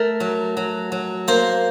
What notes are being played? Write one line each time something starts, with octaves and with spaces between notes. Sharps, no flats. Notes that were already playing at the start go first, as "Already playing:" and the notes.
Already playing: A3 A#4
F#3
F#3
F#3
A#3 C5